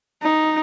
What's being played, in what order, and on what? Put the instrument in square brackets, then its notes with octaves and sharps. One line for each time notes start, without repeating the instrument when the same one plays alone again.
[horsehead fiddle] D#4